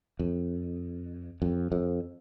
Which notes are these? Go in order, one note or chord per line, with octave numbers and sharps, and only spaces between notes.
F2
F2
F2